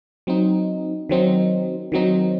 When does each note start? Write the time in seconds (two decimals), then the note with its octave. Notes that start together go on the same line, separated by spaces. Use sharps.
0.27 F#3 C4 D#4
1.09 D#3 F#3 C4 D#4
1.92 D#3 F#3 C4 D#4